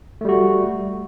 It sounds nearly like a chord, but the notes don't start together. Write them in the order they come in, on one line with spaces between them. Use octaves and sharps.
A3 G3 F#4